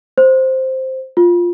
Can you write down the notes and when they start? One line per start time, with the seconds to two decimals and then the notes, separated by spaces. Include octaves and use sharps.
0.18 C5
1.17 F4